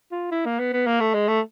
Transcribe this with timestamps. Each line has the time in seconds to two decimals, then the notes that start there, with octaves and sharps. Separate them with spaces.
0.11 F4
0.32 E4
0.46 A#3
0.59 B3
0.73 B3
0.87 A#3
1.00 A3
1.14 G#3
1.28 A3